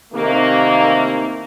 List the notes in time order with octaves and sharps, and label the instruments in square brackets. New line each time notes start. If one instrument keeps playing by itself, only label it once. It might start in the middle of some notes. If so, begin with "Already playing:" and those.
[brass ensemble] C3 D#3 E3 A3 A#3